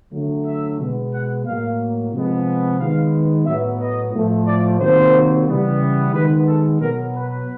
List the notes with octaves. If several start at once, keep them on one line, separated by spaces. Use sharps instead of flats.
D3 F#3 A3
E5
B2 G#3 B3
F#5
A2 F#3 A#3 F5
C3 F3 G#3 B3
D#3 G#3 B3 F5
A2 F#3 B3 E5
D#5
A2 F3 A3
D5
C3 D#3 F#3 A#3 C5
C#3 E3 G3 B3
D#3 G#3 B3 B4
A4
B2 F#3 B3 A#4
B4